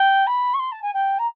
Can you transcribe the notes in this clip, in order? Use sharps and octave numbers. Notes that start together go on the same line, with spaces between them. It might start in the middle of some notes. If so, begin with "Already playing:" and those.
Already playing: G5
B5
C#6
C6
A5
G#5
G5
A#5